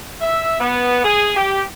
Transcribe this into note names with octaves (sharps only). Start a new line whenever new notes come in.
E5
B3
G#4
G4